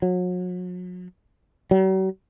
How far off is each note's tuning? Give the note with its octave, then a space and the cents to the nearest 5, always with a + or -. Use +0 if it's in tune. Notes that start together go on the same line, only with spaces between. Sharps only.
F#3 -40
F#3 +45